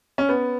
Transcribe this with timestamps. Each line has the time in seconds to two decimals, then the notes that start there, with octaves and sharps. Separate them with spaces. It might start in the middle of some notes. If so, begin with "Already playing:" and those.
0.18 C#4
0.29 B3